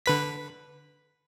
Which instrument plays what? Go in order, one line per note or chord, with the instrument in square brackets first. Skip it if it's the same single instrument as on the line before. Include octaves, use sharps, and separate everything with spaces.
[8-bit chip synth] D3 B4 B6